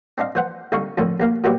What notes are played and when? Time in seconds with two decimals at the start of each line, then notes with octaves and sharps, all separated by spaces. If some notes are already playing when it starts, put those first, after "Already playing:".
0.18 C4 D4 D#5 F5
0.35 E3 C5 F#5
0.72 C2 D3 D#4 F5 C#6
0.97 F2 A2 D3 D#3
1.20 D#2 A#3 F5
1.44 A#2 F#3 B3 E4 F#4 G4